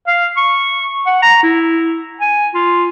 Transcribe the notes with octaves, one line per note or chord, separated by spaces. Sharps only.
F5
C#6
F#5
A#5
E4
G#5
F4